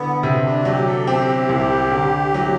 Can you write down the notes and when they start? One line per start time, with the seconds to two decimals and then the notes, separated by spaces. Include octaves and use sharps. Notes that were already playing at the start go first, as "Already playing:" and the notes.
Already playing: D3 B3 E4
0.23 C3 C4
0.44 D4
0.60 F#4
0.65 F#3 G4
0.85 A4
1.07 C4 G4
1.49 C2
1.92 D3
2.34 F#3